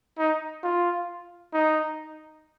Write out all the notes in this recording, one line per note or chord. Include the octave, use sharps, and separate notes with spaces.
D#4
F4
D#4